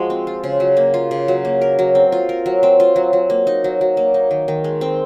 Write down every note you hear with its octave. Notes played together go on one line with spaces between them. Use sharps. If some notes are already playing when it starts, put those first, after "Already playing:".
Already playing: F3 G#3 F#4
C4
F4
C#3
F#3
A#3
F4
C#3
F#3
A#3
A#4
F#3
C4
F4
A#4
F#3
C4
F4
F#3
F#3
A#3
D#4
F#3
F#3
A#3
D#4
D#3
D#3
G#3
C4